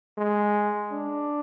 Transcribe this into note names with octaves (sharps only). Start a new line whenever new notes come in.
G#3
D4